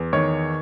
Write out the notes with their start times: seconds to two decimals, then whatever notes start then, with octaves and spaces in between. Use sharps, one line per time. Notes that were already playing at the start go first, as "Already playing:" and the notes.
Already playing: E2
0.13 D#3 C#5